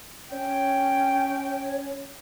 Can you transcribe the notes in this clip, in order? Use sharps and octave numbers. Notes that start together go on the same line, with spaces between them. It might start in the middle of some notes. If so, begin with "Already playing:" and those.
C#4 C#5 G5